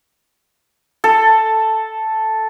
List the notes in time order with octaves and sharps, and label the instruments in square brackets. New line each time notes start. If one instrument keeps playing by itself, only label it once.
[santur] A4